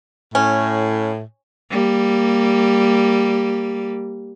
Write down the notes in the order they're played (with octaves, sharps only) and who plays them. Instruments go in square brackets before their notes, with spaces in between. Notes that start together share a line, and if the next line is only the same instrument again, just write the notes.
[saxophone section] A2 [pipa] C#4
[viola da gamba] G3 A#3